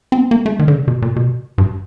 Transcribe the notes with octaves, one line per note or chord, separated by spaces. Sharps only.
C4
B3
A#3
A3
D#3
D3
C#3
B2
A#2
B2
G2